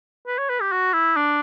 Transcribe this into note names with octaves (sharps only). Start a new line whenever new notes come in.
B4
C#5
B4
G4
F#4
E4
D4